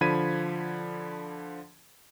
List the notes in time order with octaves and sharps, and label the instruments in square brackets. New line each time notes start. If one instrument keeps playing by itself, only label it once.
[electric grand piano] D3 F3 B5 G#6 B6 D#7